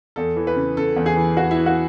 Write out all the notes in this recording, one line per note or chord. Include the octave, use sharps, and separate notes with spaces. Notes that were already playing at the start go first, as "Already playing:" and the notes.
E2 A4
E3
B4
C#3
C#3 A4
E2
G#4
E3
E2 F#4
E3 E4
F#4